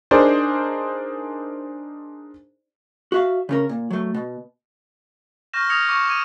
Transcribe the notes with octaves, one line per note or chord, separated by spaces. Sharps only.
D4 D#4 G#4 A#4 C5 D5
F#4 E5 F5
C#3 C#4 A#4
A#2
F#3 A3
B2
C#6 F6 G6 A#6 E7
D#6 F6 G#6 A#6 C#7 F7
C#6 D6 C#7
D6 G#6 D#7